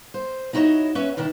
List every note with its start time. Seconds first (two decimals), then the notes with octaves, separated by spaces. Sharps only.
0.14 C5
0.53 D#4 E4 F#4 B4 C#5 D#5
0.95 C#4 B4 C#5 E5
1.17 B2 D#3 D4 E4